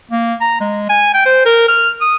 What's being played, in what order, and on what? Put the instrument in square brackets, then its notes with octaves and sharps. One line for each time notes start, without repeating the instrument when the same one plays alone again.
[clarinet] A#3
A#5
G#3
G#5
G5
C5
A#4
F6
D#6